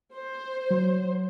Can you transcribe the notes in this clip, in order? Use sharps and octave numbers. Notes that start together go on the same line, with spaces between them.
C5
F#3